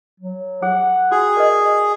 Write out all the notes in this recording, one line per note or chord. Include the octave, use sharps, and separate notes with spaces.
F#3
G#4 F#5
F#4 G#4 G5
A#4 D5 D#5